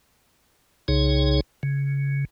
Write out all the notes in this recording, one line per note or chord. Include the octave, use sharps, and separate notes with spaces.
C2 C#3 D#4 G#4 C#5
C#3